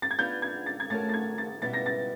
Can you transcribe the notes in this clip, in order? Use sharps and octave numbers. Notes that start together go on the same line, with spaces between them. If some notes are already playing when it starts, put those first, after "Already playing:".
A6
G#6
B3 D4 F4 G6
G#6
A6
G#6
A3 C#4 F#4 A#4 A6
A6
G#6
A6
B2 G3 B3 E4 A6
A#6
A6